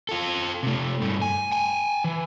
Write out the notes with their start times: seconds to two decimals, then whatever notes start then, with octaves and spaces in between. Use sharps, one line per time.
0.09 F4 A4
0.63 C3 A3
1.02 G2 A3
1.22 G#5
1.52 G5 G#5
2.04 E3